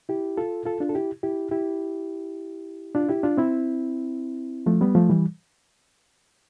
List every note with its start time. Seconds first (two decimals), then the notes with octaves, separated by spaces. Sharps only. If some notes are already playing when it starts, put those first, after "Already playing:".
0.09 E4 G4
0.37 F4 A4
0.66 F4 A4
0.80 D4 F4
0.89 A4
0.95 E4 G4
1.23 E4 G4
1.51 E4 G4
2.95 D4 F4
3.09 E4 G4
3.23 D4 F4
3.37 C4 E4
4.66 F3 A3
4.81 G3 B3
4.95 F3 A3
5.10 E3 G3